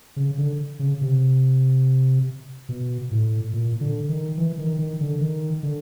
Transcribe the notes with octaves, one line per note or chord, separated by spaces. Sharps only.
C#3
D3
C#3
C3
B2
A2
A#2
D3
D#3
E3
D#3
D#3
D3
D#3
D3